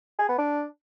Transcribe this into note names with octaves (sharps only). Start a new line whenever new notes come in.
G#4
B3
D4